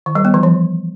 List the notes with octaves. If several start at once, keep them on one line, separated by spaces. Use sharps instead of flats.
D#3
G3
B3
E3
F3